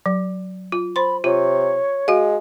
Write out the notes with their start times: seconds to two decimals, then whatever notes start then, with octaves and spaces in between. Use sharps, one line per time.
0.06 F#3
0.72 F4
0.96 C5 B5 C6
1.24 C3 F4 C#5
2.08 G#3 F#4 F5